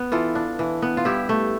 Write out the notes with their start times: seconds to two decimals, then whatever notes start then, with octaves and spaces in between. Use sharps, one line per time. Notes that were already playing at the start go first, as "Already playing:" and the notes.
Already playing: B3
0.12 E3 F4 A4
0.35 D4
0.59 E3
0.82 B3
0.97 F4
1.05 G2 E4 G4
1.29 A3